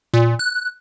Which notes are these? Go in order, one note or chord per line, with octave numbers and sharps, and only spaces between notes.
A#2
F#6